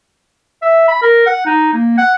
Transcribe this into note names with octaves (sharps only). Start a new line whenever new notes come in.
E5
B5
A#4
F#5
D#4
A#3
F#5